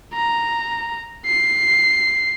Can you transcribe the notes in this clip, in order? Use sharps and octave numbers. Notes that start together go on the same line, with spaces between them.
A#5
C7